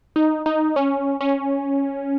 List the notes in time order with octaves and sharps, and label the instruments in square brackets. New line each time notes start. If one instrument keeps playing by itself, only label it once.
[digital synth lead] D#4
D#4
C#4
C#4